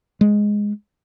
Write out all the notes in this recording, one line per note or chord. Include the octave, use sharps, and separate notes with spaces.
G#3